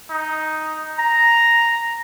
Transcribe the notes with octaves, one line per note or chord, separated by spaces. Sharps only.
D#4
A#5